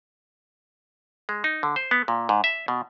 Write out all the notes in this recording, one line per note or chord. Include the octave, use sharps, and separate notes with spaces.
G#3
D#4
D3
C5
B3
A#2
G#2
E5
B2